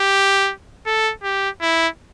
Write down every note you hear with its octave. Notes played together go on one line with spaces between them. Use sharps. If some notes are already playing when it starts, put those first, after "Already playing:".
Already playing: G4
A4
G4
E4